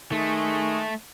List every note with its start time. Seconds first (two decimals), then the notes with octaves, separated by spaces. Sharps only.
0.12 D#3 G#3 A3 G#4 C#6